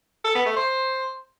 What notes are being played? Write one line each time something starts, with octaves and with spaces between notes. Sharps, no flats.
A4
B3
A3
C5